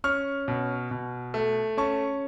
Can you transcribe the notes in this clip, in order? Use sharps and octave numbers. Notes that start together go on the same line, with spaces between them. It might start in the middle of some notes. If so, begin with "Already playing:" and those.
C#4 C#6 F6
B2
B2
A3
C#4 A5 C#6